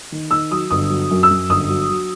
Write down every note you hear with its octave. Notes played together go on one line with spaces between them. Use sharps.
D#3
D#3 E6
F#3 D#6
G1 D#6
F#3
F#2
E6
F#2
G1 D#6
F#3
F#3